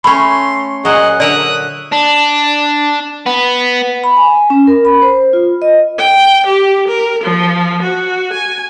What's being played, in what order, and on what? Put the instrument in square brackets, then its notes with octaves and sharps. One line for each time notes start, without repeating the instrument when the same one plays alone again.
[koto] A3 C#4 [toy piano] G5 B5 [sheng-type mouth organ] C6
[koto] A#2 F#3 [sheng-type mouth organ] G#4 D#5 F#5
[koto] D3 A#4 E5 [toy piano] D5 [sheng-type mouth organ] D#6 F#6
[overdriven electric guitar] D4
B3
[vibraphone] B5
G#5
C#4
A#4
B5
C5
F4
D#5
[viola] G5
G4
A#4
F3
F#4
G#5